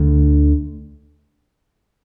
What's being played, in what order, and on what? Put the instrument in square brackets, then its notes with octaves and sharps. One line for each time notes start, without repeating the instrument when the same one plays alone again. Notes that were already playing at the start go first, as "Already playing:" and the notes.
Already playing: [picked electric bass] D2 D3